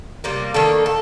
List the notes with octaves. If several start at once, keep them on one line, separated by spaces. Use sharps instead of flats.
C3 G3 A#3
D#3 A#3 D4 A4
A4